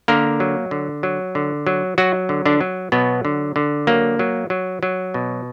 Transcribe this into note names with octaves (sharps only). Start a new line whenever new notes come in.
D3 A#3 A#4
F#3
D3
F#3
D3
F#3
F#3 F#4
D3
D3 D4
F#3
B2 F#3 B3
D3
D3
F#3 A#3
F#3
F#3
F#3
B2